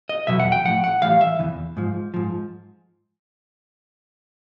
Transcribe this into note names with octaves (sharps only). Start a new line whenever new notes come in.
D#5
E2 B2 F#3 E5
F#5
G5
A2 F3 F#5
F#5
A2 E3 G3 F5
E5
E2 C#3 E3
G#2 F3
G#2 F3